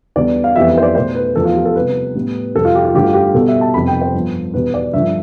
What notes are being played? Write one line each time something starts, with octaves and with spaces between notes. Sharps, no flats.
E2 D3 G3 B3 D5
F5
F2 E3 G3 B3 E5
E5
C5
D5
B2 A3 C5
B4
E2 D3 F3 A3 A4
F4
G4
A4
C3 G3 B3 B4
A2 G3 B3
F2 C3 G3 A4
F4
G4
F4
G2 D3 A3 G4
F4
G4
B2 G3 B3 A4
E5
A5
F2 C3 G3 B3 B5
G5
C5
G2 F3 B3
E2 B2 G3 B3 B4
D5
G2 D3 F3 E5